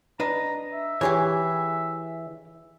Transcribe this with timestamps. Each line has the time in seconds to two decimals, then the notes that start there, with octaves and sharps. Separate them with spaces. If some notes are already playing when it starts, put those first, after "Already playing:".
0.20 D4 B4 D#5 A#5
0.73 E5
1.01 E3 G4 G#4 C#5